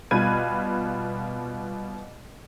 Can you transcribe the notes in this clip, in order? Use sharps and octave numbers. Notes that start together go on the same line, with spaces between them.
B2 G3 F4 B4 G#6 D#7